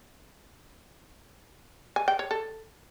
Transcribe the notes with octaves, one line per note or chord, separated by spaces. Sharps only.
G#5
G5
C#5
A4